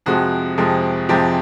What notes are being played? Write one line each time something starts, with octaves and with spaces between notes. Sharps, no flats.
F2 C3 F3 G#3 F#4
F2 C3 F3 G#3
F2 C3 F3 G#3 G4